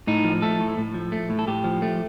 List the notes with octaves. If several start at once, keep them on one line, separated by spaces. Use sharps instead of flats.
A2 D#4
F3
A3 A4
A2
A2
F3
A3
A2
A4
A2 G4
F3
A3